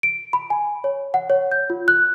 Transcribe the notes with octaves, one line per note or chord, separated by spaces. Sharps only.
D7
B5
G#5
C#5
F#5
C#5
G6
F4
F#6